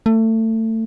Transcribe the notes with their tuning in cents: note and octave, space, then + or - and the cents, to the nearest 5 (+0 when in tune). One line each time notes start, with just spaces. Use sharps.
A3 +25